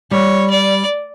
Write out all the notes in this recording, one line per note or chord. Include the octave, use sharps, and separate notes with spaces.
G3 C#5
D5